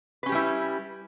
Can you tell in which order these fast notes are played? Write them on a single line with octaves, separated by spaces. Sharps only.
B4 C#4 G4 G3 E4